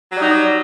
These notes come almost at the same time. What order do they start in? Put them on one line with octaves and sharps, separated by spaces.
F#3 G3 D#4